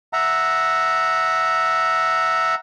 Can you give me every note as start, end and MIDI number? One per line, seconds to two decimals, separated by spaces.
0.13 2.55 76
0.13 2.55 78
0.13 2.55 82